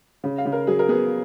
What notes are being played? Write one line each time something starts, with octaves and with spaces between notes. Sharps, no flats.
C#3
F5
C#3
A#4
F#3 G#4
A#4
B3 G#4